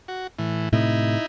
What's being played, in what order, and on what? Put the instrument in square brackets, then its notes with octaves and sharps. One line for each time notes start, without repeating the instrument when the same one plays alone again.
[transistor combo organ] F#4
A2 E3
[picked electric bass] A2 C3 A3 [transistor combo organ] D#4 E4